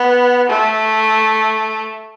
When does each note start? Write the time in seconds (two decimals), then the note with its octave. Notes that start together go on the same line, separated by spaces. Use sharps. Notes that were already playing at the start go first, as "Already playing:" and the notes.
Already playing: B3
0.49 A3